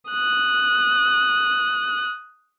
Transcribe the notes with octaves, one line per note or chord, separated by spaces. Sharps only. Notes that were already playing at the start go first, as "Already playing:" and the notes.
D#6 F#6